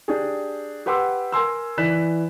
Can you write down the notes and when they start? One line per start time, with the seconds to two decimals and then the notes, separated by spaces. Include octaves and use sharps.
0.08 D4 G4 G#4
0.86 G4 B4 F#5 C6 D6 E6
1.32 A#4 G#5 C6 E6
1.78 E3 D5 F#6 B6 E7